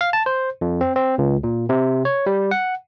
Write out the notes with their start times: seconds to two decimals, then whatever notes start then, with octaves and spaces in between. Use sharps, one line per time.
0.01 F5
0.13 A5
0.26 C5
0.61 F2
0.81 C4
0.96 C4
1.18 C#2
1.43 A#2
1.69 C3
2.05 C#5
2.26 G3
2.51 F#5